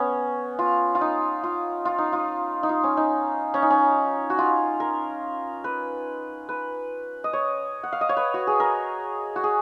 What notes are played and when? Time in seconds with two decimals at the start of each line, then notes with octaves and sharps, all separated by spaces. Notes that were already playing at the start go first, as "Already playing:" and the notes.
Already playing: B3 C#4
0.59 F4
0.95 F4
1.01 D#4
1.43 F4
1.85 F4
1.98 D#4
2.13 F4
2.63 D#4
2.69 F4
2.84 C#4
2.97 D#4
3.54 C#4
3.62 D#4
3.70 C#4
4.30 F#4
4.38 F4
4.80 A#4
5.64 B4
6.49 B4
7.24 D#5
7.33 C#5
7.83 F#5
7.92 F5
8.01 D#5
8.09 C#5
8.17 B4
8.34 F#4
8.47 G#4
8.60 A#4
9.36 F#4
9.44 G#4